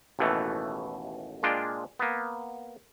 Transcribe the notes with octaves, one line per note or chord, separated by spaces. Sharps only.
A1 D#2 B2 E3 A3
A#2 G#3 D4 F4 G5
A#3 B3